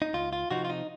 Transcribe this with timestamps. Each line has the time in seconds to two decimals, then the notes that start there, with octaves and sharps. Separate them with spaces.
0.02 D#4
0.14 C#2 F4
0.33 F4
0.51 C3 F3 C4 D#4 F#4
0.65 F4
0.70 D#4